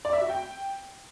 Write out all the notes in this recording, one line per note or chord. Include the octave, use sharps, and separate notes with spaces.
D5
E5
F#4
G5